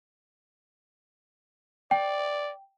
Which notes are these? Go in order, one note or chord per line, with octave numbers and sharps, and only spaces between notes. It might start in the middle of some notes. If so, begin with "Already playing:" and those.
D5 G5